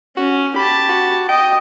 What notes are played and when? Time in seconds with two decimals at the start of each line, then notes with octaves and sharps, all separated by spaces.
0.17 C#4 F#4
0.56 G4 A5 B5
0.89 F#4
1.29 D#5 G5